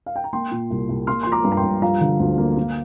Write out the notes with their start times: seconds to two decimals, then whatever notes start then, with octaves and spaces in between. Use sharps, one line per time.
0.06 F5
0.16 G5
0.24 A#5
0.33 A#3 G5 C6
0.51 A#2
0.70 C2
0.89 C2
1.07 A#3 C6 F6
1.23 F3 C6
1.32 A#5 D6
1.45 G2
1.52 A#5
1.57 G5 C6
1.63 G2
1.82 F3 F5 A#5
2.01 D3
2.19 D2
2.38 A#3
2.56 A#3